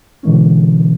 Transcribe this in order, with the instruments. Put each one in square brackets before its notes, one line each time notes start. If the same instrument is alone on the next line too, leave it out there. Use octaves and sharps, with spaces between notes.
[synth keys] B2 D3 E3 G#3 A#3 C#4